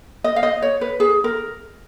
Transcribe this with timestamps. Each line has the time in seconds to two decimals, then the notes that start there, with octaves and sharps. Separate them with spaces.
0.24 D#5
0.36 F5
0.43 D#5
0.62 C#5
0.81 B4
1.00 G#4
1.24 A#4